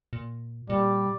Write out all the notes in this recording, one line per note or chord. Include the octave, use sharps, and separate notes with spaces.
A#2
A#2 G3 D5